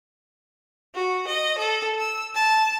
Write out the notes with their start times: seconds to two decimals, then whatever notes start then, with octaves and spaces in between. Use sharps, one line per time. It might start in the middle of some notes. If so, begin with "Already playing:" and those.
0.95 F#4
1.27 D#5
1.59 A4
1.99 E6
2.34 A5